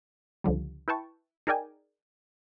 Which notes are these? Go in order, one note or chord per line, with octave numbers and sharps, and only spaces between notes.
C#2 D3 F3 G3
E4 B4 G5 A5 C#6
D#4 G#4 A#4 D5 G5 G#5